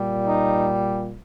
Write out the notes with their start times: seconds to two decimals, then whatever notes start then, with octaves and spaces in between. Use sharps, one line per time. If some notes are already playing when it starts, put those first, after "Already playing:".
Already playing: A#2 G3
0.26 D#4